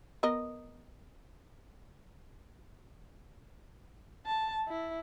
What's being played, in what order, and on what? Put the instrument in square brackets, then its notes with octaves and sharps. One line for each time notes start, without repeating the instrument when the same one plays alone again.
[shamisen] B3 A#4 D#5
[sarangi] A5
E4